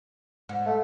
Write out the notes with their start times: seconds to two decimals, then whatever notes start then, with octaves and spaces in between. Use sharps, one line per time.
0.49 G#2
0.66 A3